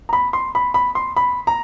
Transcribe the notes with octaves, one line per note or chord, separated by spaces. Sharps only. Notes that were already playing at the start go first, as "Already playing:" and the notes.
A#5
B5
C6
B5
B5
C6
B5
A#5